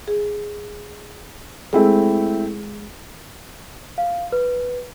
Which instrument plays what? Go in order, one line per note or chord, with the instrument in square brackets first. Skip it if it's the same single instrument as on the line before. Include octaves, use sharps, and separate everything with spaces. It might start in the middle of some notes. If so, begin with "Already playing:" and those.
[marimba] G#4
[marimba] G#3 G#4 [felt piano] A3 C4 E4
[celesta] F5
B4